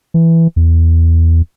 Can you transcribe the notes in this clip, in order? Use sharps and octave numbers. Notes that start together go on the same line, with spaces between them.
E3
E2